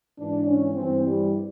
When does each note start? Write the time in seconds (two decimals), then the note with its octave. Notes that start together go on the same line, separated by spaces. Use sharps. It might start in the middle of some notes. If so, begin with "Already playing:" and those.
0.19 G#2 E3 D4
0.47 C#4
0.75 G2 E3 C4
1.04 G3